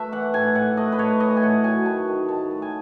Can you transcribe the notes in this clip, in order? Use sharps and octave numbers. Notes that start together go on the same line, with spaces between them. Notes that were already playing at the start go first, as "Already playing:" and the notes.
Already playing: A3 B4 E5
E3 F#5
A2 G#5
A2 F#5
A3 D#5
B4
A2 C#5
E3 D#5
G#5
A2 F#5
F#3 G#5
D#3 A5
D#3
D#3 A5
A3
G#5